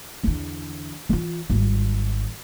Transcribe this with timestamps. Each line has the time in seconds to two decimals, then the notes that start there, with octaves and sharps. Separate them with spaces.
0.23 E2 D3
1.09 E3 F4
1.50 G#1 G3